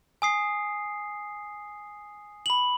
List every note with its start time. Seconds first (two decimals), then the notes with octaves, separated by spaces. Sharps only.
0.22 G#5 D#6 C7
2.46 B5 F#7